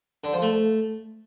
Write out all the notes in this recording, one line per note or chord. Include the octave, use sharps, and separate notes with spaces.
D3
F3
A3